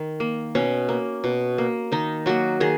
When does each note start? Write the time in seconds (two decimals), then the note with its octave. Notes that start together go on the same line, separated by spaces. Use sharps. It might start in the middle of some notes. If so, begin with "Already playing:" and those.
Already playing: D#3
0.20 A#3
0.55 B2 C#4
0.89 A#3
1.24 B2
1.58 A#3
1.92 D#3 D#4
2.26 F#3 A#3 F#4
2.60 D#3 G#4